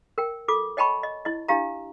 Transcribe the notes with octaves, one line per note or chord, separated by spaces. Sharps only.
A#4 G5
F4 A4 D6
C#5 D#5 G5 A5 B5 C#6
D#5
E4 D#5
D4 E4 G4 F5 A#5